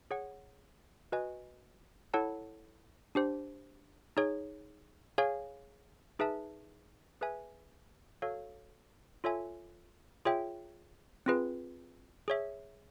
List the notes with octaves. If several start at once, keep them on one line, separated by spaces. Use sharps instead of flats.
G#4 C#5 F#5
F#4 B4 D#5 G#5
E4 A4 C#5 F#5 A5
D4 G4 C5
D#4 G#4 C#5
G#4 C#5 F5 G#5
D#4 G#4 B4 E5 A5
G#4 B4 E5 G#5
F#4 A4 C#5 F5
F4 A4 C#5 E5 G#5
F4 G#4 C#5 E5 G5
C4 F4 G#4 B4
G#4 C#5 E5